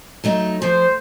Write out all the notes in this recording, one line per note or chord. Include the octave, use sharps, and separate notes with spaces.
F#3 A3 D#4
F3 C5